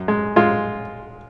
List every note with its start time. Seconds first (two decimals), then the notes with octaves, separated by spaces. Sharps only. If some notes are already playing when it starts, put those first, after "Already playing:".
Already playing: F#2
0.08 G#3
0.36 G#3 F4